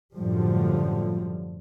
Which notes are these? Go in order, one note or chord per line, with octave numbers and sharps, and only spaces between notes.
F#2 A2 D3 F3 G3